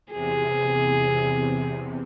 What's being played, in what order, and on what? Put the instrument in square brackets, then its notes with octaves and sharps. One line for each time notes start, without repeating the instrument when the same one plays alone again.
[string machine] E2 C3 [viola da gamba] G#4